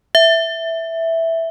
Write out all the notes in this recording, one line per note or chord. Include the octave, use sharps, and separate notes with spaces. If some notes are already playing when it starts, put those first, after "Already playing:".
E5